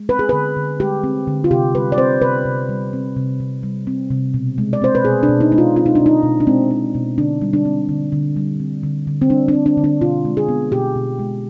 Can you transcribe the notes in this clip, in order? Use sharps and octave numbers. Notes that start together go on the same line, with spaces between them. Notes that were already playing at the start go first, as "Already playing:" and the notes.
Already playing: G#3
C4 B4
G#4
D3 B4
D3
G#3 G4
C4
D3
F4
C3 G4
G3 B4
D5
C4 C5
C3 B4
C3
G3
C4
C3
C3
G3
C4
C3
B2
G#3
D5
C4 C5
B4
B2 G#4
D4
B2
D#4
G#3 D#4
F4
C4 F4
D#4
B2 D4
D#4
B2
D4
G#3 C4
C4
B2
D3 D4
G3
D4
C4
D3
D3
G3
C4
D3
D3
C4
G3 D4
D4
C4
D4
D3
D4
B2 F4
G#3
G#4
B3
B2 G4
B2
G#3